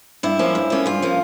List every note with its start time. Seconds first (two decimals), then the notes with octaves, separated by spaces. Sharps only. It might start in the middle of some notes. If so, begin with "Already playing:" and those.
0.23 G2 E4
0.39 F3 A#3 C#4
0.55 G2
0.70 F3 A#3 C#4
0.86 G2 F4
1.02 F3 A#3 C#4